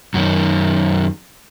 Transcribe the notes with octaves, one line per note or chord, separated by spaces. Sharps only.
F#2 D#3